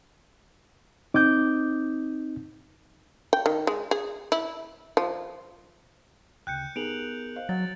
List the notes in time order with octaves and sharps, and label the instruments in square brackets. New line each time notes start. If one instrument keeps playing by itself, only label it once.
[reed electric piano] C4 D#4 [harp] D6 D#6 G6
[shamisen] G5
D#3
G#3
G#4
E4
F3
[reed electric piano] D2 C#3 [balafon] G5 [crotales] F#6 G6 C#7
[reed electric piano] B3 G#4 A#4 [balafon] D#4 G4 [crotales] D7 F7 F#7
[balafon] C5 D#5 F5
[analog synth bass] F#3 [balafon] F#4 C#5 F#5 [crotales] A6